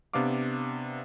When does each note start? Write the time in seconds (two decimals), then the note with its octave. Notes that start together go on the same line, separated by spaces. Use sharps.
0.13 C3 B3 D4 F5 D6